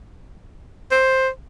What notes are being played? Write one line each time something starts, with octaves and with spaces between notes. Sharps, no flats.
C5